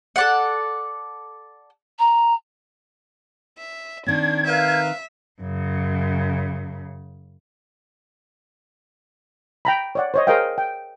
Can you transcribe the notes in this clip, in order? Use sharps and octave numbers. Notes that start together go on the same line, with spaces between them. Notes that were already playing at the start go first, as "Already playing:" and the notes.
A4 D5 F#5
A#5
E5
D#3 C4 D4 G#6
A#4 B4 E5 F5
F#2 C#3
G5 A#5 B5
C#5 D5 F#5
C5 C#5 D#5
G#4 A#4 C5 D#5 F5 G5
G5